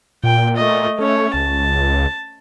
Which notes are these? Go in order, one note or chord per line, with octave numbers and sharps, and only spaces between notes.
A#2 G5
A3 D#5
A3 C#4 C#5
C#2 A5